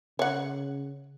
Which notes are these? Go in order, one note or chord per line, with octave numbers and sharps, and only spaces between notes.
C#3 C#5 F#5